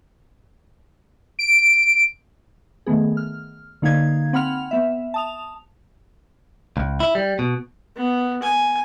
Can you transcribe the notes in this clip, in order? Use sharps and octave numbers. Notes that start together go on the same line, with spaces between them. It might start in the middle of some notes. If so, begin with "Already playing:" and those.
D7
D#3 A3 B3 G#4
F6
D3 A#3 D#4 F5 G#6
C4 F#5 B5 F6 F7
B3 E5
A5 D#6 F7
C#2
E4
G3
B2
B3
G#5